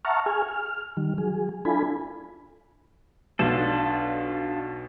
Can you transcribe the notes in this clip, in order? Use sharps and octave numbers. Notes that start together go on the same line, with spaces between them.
E5 F#5 A5 A#5 C#6 F6
G#4 G#5 F6
F6
D#3 G3
F#3 G#4
D4 E4 F4 A4 G#5 B5
B1 B2 D4 F4 A4 E7